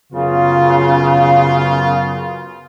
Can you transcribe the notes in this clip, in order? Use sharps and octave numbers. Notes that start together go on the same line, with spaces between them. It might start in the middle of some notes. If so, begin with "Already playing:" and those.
F#2 C#3 B3 F4